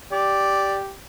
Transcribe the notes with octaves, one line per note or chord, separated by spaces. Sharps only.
G4 D5